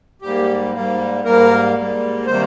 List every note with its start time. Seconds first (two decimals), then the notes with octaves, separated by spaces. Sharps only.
0.22 G#2 G3 A#3 G4
0.73 G#2 G3 A#3
1.24 G#2 G3 A#3 A#4
1.76 G#2 G3 A#3
2.27 C3 D#3 G3 A#3 C5